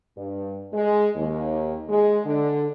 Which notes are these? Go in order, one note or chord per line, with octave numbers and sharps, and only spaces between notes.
G2
G#3
D#2
G#3
D3